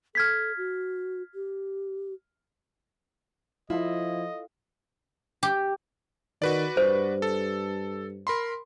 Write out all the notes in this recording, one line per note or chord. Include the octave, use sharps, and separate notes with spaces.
A4 F6 G#6 B6
F#4
G4
F3 E4 F4 A4 D#5
G4
D#3 F#4 B4 D5
G2 C5
A4
A#4 B5 C6